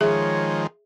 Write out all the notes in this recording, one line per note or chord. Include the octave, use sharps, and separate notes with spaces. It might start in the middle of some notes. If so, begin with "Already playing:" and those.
D#3 F3 G#3 G#4 C#5 E5